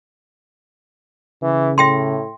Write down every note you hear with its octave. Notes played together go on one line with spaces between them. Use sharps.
C#3 E3
A2 E5 G5 C6